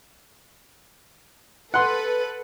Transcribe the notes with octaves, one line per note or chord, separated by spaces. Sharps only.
A4 B4 F#5 C6